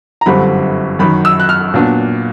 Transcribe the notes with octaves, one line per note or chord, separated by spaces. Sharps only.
A#5
G1 F#2 D3 G3 C4 B5
F#2 D#3 F#3 B5
E6
F#6
F6
A#2 F#3 B3 D4